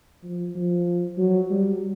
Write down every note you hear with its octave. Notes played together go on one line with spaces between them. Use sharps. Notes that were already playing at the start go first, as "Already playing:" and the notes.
F3
F3
F#3
G3